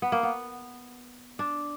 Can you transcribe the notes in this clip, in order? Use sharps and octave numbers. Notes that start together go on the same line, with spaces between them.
B3
A#3
B3
D4